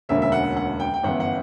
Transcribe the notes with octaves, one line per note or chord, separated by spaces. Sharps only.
E1 D2 D3 A#3 C#4 E5
E5
F#5
F#5
G5
G5
G1 F#2 E3 B3 F#5
F#5